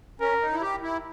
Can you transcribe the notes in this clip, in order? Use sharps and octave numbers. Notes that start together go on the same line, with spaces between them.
C#4 A#4
D#4
E4
G4
E4